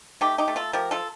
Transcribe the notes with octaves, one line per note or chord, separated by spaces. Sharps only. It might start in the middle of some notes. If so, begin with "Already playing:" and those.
A3 D#4 G4
D#4 G4
A3
F4 A4
F3 G4 A#4
F4 A4